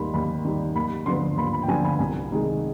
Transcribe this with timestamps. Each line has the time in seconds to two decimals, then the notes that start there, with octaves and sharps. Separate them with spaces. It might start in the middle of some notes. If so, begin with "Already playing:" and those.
Already playing: D#2 D#3 G3 B5 C6
0.14 D#2 B5
0.45 D#3 G3
0.75 D#2 B5
1.06 D3 F3 B3 C6
1.37 D#2 B5
1.53 B5
1.63 G5
1.68 D3 F3 B3 G#5
1.84 B5
1.99 C2 G#5
2.31 C3 D#3 G#3